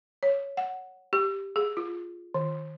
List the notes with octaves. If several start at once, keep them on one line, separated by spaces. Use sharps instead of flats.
C#5
F#5
G4
G#4
F4
D#3